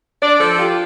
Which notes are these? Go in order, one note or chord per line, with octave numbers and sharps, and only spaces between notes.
D4 D5
F3 A4
F4 G4